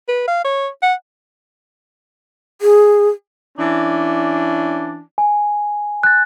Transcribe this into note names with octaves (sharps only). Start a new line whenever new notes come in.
B4
F5
C#5
F#5
G#4
E3 C#4 D4
G#5
F#6 A6